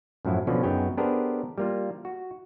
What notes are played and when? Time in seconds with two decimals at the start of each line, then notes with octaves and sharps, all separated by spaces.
0.25 F#2 A2 F3 F#3 E4
0.47 B2 D3 F3 C#4 F#4
0.63 F#2 B3 D#4 G#4 C#5 G5
0.97 B3 D4 G4 G#4 A#4 C5
1.58 G3 A#3 F4
2.05 F#4